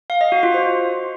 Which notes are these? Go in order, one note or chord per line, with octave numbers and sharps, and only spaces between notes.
F5
D#5
F#4
F4
C5